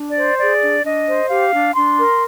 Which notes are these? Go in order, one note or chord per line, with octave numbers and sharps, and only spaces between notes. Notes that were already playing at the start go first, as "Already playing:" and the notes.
Already playing: D4
D5
C5
G#4 D5
D4
D4 D#5
C5
G4 F5
D4
D4 C6
A#4